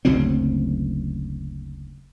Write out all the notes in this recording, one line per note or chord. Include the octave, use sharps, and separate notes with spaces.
F#1 D2 F#3 C4